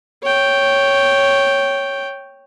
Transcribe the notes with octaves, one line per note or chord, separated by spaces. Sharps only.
C#5 G5